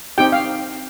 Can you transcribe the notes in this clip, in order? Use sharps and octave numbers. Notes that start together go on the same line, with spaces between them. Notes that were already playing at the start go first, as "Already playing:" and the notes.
C4 D#4 G4 G5
F5